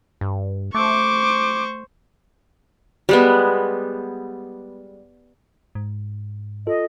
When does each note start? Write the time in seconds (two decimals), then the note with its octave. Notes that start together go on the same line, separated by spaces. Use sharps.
0.21 G2
0.74 A3 C5 C#6 D6
3.09 G3 G#3 B3
5.75 G#2
6.67 F4 A4 D#5